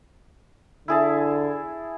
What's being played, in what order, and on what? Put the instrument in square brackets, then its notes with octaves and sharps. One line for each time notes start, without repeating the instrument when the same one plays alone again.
[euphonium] D3 [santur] E4 G#4 A5